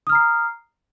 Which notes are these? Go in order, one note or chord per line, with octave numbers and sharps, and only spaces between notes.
A#5 D#6 F6 C7